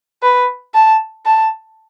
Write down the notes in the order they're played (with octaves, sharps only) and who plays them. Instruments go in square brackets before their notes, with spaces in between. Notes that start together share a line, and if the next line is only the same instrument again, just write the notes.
[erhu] B4
A5
A5